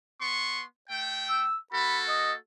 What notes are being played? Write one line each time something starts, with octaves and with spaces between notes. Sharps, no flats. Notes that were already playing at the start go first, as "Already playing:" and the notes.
B3 C6 C#6
A3 G5
E6
A#3 F#4 A4 B5
D#5